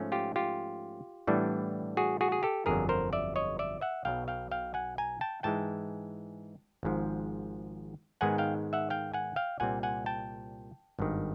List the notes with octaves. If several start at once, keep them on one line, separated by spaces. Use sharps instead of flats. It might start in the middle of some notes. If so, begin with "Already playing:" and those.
Already playing: G#2 F3 A3 C#4
F4 G4
F4 G4
A2 E3 G3 B3 D4
F#4 G#4
F#4 G#4
G#4
G4 A4
G1 F2 D3 F#3 G#4 A#4
A#4 C5
D5 E5
C#5 D#5
D5 E5
E5 F#5
B1 B2 F#3 F5 G5
F5 G5
F5 G5
F#5 G#5
G#5 A#5
G5 A5
G#2 E3 G#3 G5 A5
G#1 G#2 F3
G#2 D#3 G#3 B3 F#5 G#5
F5 G5
E5 F#5
F5 G5
F#5 G#5
F5 G5
C2 A#2 G3 C4 F#5 G#5
F#5 G#5
G5 A5
G#1 G2 D#3